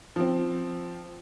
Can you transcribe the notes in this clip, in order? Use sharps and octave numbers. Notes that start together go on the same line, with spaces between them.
F3 C4